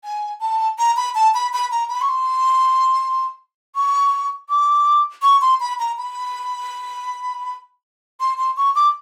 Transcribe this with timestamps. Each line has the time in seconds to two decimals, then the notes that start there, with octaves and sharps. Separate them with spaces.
0.04 G#5
0.41 A5
0.79 A#5
0.97 B5
1.15 A5
1.34 B5
1.53 B5
1.71 A#5
1.89 B5
2.01 C#6
2.08 C6
3.75 C#6
4.49 D6
5.23 C#6
5.41 C6
5.60 B5
5.79 A#5
5.98 B5
8.20 C6
8.38 C6
8.57 C#6
8.75 D6